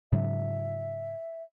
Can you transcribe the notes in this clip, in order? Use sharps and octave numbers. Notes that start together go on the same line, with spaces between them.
G#2 C#3 F#3 E5